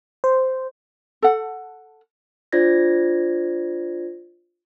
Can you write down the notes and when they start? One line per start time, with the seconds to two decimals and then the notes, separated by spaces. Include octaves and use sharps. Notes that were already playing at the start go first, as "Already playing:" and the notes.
0.24 C5
1.22 A4 F#5
2.52 D4 F4 C5 D5 G#6 A#6